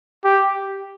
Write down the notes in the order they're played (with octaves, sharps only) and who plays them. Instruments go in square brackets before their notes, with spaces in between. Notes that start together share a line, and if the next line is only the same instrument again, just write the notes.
[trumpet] G4